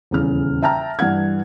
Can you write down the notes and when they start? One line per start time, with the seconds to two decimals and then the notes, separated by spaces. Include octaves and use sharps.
0.11 D#1 E2 C#3 F6
0.63 E5 G5 A5 A#5 F6
0.99 G2 E3 F#5 G#6